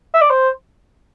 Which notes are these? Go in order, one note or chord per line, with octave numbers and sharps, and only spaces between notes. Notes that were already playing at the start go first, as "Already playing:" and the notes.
E5
D5
C5